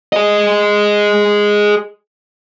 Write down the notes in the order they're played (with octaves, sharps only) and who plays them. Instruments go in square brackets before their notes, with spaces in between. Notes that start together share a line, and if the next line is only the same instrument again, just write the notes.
[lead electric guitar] G#4 D#5